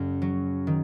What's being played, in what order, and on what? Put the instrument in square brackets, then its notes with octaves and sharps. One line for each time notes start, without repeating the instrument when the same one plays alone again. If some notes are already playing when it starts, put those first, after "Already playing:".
Already playing: [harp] F#1 F#2
F#3
D#3